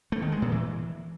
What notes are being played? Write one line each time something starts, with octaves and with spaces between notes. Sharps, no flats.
A3
D#3
G#3
A#2
E3